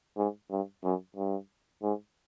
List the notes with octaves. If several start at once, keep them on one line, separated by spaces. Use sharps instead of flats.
G#2
G2
F#2
G2
G#2